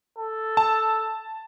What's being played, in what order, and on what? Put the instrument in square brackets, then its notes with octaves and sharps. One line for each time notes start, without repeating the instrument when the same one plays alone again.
[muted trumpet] A4
[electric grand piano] A5